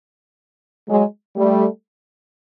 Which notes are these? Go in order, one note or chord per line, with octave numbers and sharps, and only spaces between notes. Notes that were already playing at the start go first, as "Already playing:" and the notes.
F#3 G#3
G3 A3